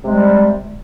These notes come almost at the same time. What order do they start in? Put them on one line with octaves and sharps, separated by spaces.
C3 G#3 G3